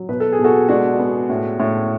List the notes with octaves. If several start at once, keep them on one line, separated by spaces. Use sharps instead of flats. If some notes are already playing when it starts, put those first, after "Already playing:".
Already playing: F#3
B2 B4
A4
G#4
B2
F#4 A4
G#3 D4 F#4
B3
A2
A2